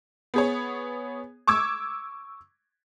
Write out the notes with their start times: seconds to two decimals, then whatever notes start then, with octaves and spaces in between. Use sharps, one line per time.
0.34 B3 G#4 C#5
1.47 C#6 D6 E6 G#6